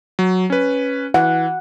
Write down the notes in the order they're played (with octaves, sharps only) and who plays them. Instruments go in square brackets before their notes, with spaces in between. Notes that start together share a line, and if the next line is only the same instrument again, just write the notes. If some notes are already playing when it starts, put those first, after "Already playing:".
[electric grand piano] F#3
C#4 B4
[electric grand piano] E3 [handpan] F#5